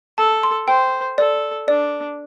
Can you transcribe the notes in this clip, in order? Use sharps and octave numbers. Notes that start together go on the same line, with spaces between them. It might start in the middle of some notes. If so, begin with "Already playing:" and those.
A4 A5
C6
C5 G5
A4 D5
D4 D5